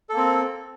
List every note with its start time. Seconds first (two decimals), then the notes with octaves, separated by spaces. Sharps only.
0.09 A4
0.13 A#3
0.17 C4